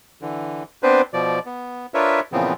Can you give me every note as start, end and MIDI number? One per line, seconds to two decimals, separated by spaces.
0.22 0.63 50
0.22 0.63 52
0.83 1.01 59
0.83 1.01 60
0.83 1.01 62
0.83 1.01 71
0.83 1.01 72
1.13 1.39 47
1.13 1.39 53
1.13 1.39 74
1.46 1.86 59
1.94 2.20 62
1.94 2.20 65
1.94 2.20 70
1.94 2.20 71
1.94 2.20 73
1.94 2.20 76
2.32 2.53 46
2.32 2.53 49
2.32 2.53 52
2.32 2.53 53
2.32 2.53 59
2.32 2.53 60